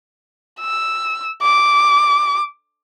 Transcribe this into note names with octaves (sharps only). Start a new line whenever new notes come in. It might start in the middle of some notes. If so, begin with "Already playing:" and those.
E6
D6